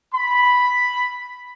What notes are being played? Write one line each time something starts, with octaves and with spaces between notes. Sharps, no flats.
B5